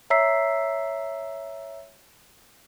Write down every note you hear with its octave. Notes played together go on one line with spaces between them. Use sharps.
C#5 E5 A#5 E6 B6 C7